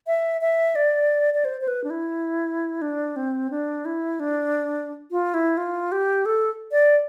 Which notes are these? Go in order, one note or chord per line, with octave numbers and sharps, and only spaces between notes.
E5
E5
D5
D5
C5
C5
B4
D4
E4
D4
C4
D4
E4
D4
F4
E4
F4
G4
A4
D5